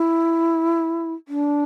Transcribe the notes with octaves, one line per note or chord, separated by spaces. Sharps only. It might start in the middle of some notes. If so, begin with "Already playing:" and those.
Already playing: E4
D4